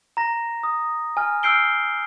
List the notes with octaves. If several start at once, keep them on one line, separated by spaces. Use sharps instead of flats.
A#5 A#6
D#6
G#5 F6
E6 F6 G6 C7 D7 G7